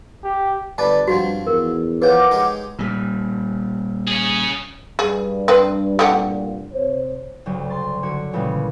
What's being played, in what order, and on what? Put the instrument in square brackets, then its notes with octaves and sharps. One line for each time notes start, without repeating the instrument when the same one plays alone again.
[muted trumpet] G4
[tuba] G1 [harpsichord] G3 B4 D5 [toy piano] A5
[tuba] G2 [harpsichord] F3 F#3 C4 [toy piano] F#4
[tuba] E2 [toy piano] A#4
[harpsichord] F3 G5 [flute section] A#4 F#5 D6 [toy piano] B4 C#5
[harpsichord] G#3 D#4 G4
[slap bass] A#2 G3
[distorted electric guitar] C#4 G#4
[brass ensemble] G2 [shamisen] G#4
[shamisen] C4 B4
[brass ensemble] C2 G2 A#2 [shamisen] A3 G4 F#5
[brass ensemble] C3 C5 C#5
[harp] D2 G2 C#3 F#3
C6 A6
D3 F#4 C#5
A#2 C#3 E3 G3 G#3 C#4